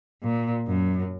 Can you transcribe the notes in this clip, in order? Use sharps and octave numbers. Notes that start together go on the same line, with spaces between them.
A#2
F#2